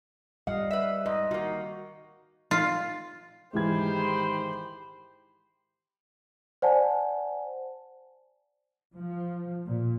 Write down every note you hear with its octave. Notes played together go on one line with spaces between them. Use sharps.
G3 D#5 F5 F#5
B4 E5
G#2 D#5
D#3 A#3 F#4
F4
G#2 D#3 E3 G4 G#4 C5 B5 G#6
C5 D5 F#5 G#5 A5
F3
A#2